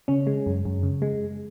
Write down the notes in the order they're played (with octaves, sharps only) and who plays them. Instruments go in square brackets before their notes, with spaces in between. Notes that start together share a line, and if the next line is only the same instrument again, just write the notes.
[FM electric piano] C#3 C#4
G#3
F#2
F#2
C#3
G#3